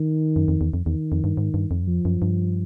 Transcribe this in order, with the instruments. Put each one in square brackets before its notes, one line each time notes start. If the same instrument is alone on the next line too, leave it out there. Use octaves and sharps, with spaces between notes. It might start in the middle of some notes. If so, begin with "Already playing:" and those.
Already playing: [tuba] D#3
[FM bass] F#2
F2
E2
F2
[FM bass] E2 [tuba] D#3
[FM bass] F2
G2
G#2
G2
F2
F#2
[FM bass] F2 [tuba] F3
[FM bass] F#2
G2